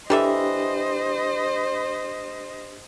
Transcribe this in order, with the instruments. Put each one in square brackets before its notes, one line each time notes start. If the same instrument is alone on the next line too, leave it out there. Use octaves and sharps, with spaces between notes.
[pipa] E3 A4 E5 [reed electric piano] D4 G4 [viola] C5 D#5